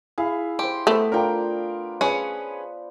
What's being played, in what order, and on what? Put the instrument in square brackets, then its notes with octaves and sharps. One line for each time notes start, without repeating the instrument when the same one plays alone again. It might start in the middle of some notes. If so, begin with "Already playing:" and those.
[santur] E4 [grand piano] G#4 F5
[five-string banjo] G4 [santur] C5 C6
[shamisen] A3 [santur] B3 B4 C5
[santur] D4 F4 D5 [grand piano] A#4 G5 A#5
[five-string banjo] C#4 G#4 [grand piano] B4 C#5